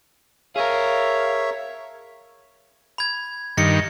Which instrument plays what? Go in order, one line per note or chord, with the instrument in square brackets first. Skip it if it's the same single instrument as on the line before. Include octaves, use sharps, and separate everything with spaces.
[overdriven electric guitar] G#4 A#4 [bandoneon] C#5 E5 [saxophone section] F5
[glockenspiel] B5 G#6
[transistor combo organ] G2 D#3 [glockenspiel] A#6 C#7